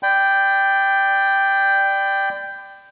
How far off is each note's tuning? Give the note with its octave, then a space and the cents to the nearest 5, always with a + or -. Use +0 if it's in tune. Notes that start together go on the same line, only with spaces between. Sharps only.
D5 +10 G5 +0 B5 +35